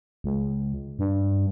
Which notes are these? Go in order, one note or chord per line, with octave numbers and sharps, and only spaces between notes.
C#2
G2